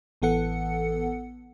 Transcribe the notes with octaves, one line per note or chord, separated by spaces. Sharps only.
A1 E3 B3 A4 F#5 C#7